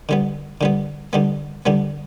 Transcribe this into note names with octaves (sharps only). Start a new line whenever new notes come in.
D3 G3 B3
D3 G3 B3
D3 G3 B3
D3 G3 B3